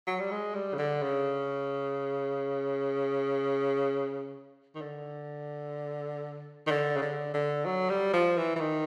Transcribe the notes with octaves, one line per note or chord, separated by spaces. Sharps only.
F#3
G3
G#3
G3
C#3
D3
C#3
D#3
D3
D#3
D3
C#3
D3
D3
F#3
G3
F3
E3
E3
D#3